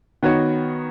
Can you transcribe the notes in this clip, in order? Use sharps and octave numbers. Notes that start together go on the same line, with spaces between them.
D#3 B3 F#4 C#5